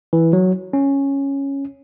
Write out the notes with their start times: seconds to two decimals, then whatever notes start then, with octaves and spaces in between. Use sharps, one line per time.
0.13 E3
0.33 F#3
0.73 C#4